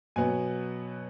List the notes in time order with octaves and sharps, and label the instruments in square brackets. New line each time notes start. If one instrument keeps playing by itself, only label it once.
[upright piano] B2 F#3 B3 G#5